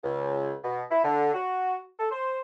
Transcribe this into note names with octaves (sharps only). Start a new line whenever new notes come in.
C#2
B2
E4
D3
F#4
A4
C5